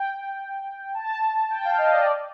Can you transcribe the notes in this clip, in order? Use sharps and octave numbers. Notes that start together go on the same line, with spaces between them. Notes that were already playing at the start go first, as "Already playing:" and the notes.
Already playing: G5
A5
G5
F5
D#5
D5
D5